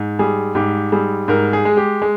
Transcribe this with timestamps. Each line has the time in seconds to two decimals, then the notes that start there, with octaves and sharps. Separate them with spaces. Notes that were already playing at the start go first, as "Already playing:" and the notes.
Already playing: G#2
0.19 G3 G#4
0.55 G#2 G4
0.92 G3 G#4
1.28 G#2 A#4
1.53 G#4
1.65 G#3
1.77 G4
2.02 G#3